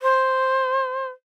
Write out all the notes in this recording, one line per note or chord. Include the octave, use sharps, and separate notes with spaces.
C5